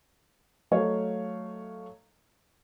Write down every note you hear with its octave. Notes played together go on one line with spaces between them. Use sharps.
F#3 A3 C#5 D#5 F5